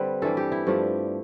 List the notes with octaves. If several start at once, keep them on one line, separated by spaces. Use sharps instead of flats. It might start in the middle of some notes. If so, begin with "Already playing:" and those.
Already playing: D3 G3 C4 B4
G2 E3 G3 A4
G4
E4
G2 F3 A3 D4